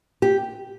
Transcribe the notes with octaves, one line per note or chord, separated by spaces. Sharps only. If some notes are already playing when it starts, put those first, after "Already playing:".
G4